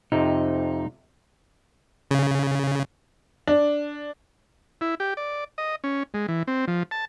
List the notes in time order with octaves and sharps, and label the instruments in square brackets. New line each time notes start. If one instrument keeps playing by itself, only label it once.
[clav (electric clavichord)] F2 C3 [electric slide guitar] D#4
[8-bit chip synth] C#3
[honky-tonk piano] D4
[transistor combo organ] E4
G4
D5
D#5
C#4
G#3
E3
C4
F3
A5